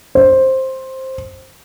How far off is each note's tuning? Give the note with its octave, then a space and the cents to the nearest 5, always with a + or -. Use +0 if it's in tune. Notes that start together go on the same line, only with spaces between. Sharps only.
C5 +10